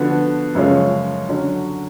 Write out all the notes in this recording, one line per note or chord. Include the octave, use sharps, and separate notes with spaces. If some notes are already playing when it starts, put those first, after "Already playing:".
Already playing: D3 F3 B3 F#4
F#2 C#3 F3 G#3 C#4
D3 F#3 C#4